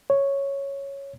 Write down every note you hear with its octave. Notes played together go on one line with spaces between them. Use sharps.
C#5